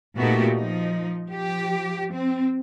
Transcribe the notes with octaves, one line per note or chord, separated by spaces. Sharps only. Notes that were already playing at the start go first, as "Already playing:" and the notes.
A#2 A3 B3 D#4 F#4 G4
F3 D#4
F3 G4
C4